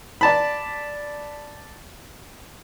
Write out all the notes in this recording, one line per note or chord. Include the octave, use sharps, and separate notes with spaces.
D5 A5 B5